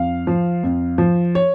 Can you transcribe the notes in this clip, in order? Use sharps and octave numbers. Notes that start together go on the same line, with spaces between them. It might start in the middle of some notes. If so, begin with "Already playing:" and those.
Already playing: F2 F5
F3
F2
F3
C#5